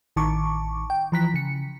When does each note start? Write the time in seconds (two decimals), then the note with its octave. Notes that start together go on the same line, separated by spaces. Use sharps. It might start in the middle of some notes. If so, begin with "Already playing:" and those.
0.16 A1 D#3 A5 C#6 D6
0.90 G5
1.12 E3 F3 A#5 F#6 B6
1.34 C#3 C#7